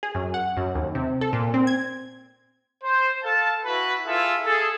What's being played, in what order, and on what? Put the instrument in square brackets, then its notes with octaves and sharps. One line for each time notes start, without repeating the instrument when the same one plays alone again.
[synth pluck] G#4
F#2
F#5
F#2
D#2
C3
A4
A#2
C4
G#6
[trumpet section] C5
A4 F5 A5
E4 F#4 B4
E4 F4 G#4 A4 E5
G#4 A4